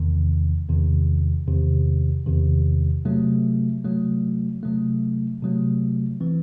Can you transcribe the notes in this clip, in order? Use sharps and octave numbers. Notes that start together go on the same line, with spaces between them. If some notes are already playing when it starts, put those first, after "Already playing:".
Already playing: E2 C3 D#3
E2 C3 D#3
E2 C3 D#3
E2 C3 D#3
C3 F#3 A3
C3 F#3 A3
C3 F#3 A3
C3 F#3 A3
E3 C4